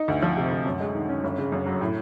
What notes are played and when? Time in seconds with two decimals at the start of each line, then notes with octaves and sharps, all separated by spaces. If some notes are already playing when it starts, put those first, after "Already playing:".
Already playing: D#4
0.08 D2
0.22 F3
0.37 C3
0.51 D2
0.66 F#2
0.80 G#3
0.95 D#3
1.09 C#4
1.24 G1
1.38 C#3
1.52 F#2
1.66 F#3
1.81 A2